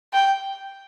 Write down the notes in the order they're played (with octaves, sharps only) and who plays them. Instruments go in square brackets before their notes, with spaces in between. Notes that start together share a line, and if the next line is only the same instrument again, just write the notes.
[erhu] G5